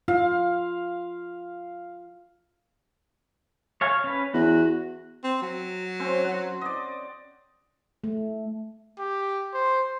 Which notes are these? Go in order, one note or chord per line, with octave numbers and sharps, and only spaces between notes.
F4 F5
C#5 F5 G#5
C#4 B4
E2 F#4
C4
F#3
C4 C#4 C5
F#5
D5 D#5
A3
G4
C5